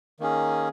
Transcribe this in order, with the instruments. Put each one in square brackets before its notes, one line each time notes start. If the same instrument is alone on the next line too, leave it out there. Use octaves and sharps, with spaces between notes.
[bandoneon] D#3 A#3 C#4 G#4